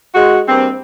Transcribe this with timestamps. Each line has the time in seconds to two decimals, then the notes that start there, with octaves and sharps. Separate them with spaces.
0.14 G#3 F#4
0.48 G2 A#3 C4